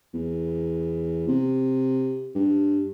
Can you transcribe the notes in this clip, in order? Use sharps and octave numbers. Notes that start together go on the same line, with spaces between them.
E2
C3
G2